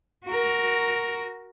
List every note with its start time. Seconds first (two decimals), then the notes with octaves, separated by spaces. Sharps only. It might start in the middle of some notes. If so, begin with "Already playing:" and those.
0.25 F#4 A#4